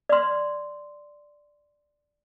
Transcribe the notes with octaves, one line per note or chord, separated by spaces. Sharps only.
D5 C6